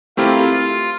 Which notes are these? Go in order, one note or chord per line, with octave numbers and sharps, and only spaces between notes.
A3 C4 E4 F4 G4 A#4
F4